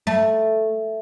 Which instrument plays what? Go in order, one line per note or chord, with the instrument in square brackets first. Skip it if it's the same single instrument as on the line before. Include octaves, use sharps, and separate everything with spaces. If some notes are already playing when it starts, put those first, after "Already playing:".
[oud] A3